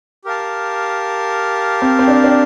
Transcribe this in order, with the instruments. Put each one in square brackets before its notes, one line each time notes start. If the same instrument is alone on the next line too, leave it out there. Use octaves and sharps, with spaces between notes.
[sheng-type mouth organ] G4 A#4 F5 A5
[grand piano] C4
C4
D4
D4